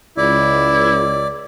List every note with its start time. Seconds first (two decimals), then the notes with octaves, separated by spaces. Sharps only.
0.17 C#2 E4 D5